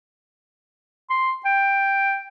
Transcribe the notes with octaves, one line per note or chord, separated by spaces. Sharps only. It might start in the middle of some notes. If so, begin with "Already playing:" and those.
C6
G5